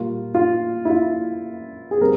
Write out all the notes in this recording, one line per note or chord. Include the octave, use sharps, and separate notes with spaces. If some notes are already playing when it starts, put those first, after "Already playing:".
Already playing: A#2 G3 A#3 F4
F4
E4
F4
G#4
G3 C4 A#4